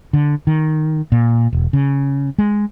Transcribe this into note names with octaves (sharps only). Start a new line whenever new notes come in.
D3
D#3
A#2
E1
C#3
G#3